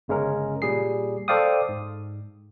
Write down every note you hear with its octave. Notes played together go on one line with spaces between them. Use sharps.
G1 C#3 G#3 C#4 A#4
A#2 G3 G#4 C7
A4 C5 D5 F5 G5 D#6
G#2